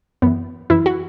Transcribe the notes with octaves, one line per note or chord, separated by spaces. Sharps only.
F#2 E3 B3
F#2 E3 E4
F#4